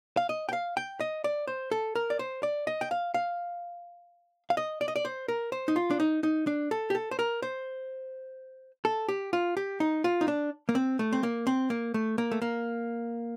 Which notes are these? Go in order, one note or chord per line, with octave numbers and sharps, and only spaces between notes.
F5
D#5
G5
F5
G5
D#5
D5
C5
A4
A#4
D5
C5
D5
D#5
G5
F5
F5
F5
D#5
D5
D#5
D5
C5
A#4
C5
D#4
F4
D4
D#4
D#4
D4
A4
G4
A4
C5
A#4
C5
A4
G4
F4
G4
D#4
F4
D#4
D4
A#3
C4
A3
C4
A#3
C4
A#3
A3
A#3
A3
A#3